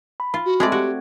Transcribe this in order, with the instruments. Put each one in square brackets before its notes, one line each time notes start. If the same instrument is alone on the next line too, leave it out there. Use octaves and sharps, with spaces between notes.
[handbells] B5
[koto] F4 [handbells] B5
[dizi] F#4
[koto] G#3 A3 D5 [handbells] C4 G#6
[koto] F#4 [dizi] G4